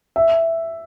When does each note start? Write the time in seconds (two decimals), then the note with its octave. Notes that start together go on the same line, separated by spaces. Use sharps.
0.16 E5